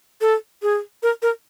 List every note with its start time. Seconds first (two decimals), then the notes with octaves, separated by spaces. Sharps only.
0.21 A4
0.62 G#4
1.03 A#4
1.22 A#4